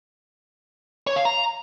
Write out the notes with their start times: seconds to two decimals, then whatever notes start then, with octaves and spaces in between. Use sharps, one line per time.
1.07 C#5
1.16 F5
1.25 A#5